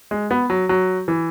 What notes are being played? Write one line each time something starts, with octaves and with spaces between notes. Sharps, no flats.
G#3
B3
F#3
F#3
E3